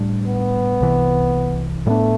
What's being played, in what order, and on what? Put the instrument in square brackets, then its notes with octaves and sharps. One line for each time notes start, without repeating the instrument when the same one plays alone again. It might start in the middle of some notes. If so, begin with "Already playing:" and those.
Already playing: [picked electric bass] A2 G3 D4
[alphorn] B3
[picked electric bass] C2 C3 E3
[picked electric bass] A2 G3 [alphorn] A3
[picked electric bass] B3 D4